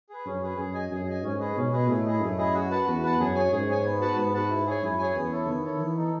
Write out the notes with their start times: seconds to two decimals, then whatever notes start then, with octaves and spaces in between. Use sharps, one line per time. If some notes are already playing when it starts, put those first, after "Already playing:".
0.09 G#4 B4
0.25 F#2 C#4
0.42 G#4 B4
0.58 F#2 G#4
0.74 D#5 G#5
0.91 F#2 G#4
1.06 D#5 G#5
1.23 G#2 C#4
1.39 G#4 B4 D#5
1.56 B2 C#4
1.72 G#4 B4 D#5
1.88 A2 A3
2.05 E4 G#4 D#5
2.21 F#2 A3
2.38 E4 G#4 D#5
2.54 F#4
2.71 B4 F#5 A5
2.86 E2 F#4
3.03 B4 F#5 A5
3.19 F#2 G#4
3.35 C#5 G#5
3.52 G#2 G#4
3.68 C#5 G#5
3.84 B3
4.01 F#4 B4 F#5 A5
4.17 G#2 B3
4.34 F#4 B4 F#5 A5
4.50 E4
4.66 G#4 C#5 G#5
4.83 F#2 E4
4.98 G#4 C#5 G#5
5.15 E2 B3
5.32 E4 A4 C#5
5.47 D#3 B3
5.64 E4 A4 C#5
5.80 E3 B3
5.97 D#4 A4